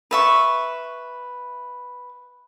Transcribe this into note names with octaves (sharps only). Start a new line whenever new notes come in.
B4 E5 C#6